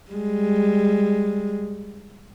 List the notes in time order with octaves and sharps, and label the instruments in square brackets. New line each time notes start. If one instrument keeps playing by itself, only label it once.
[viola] G3 G#3